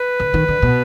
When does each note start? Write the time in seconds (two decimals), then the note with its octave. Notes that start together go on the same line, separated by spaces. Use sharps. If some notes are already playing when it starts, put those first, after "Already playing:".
Already playing: B4
0.20 D3
0.34 D#3
0.48 D3
0.62 B2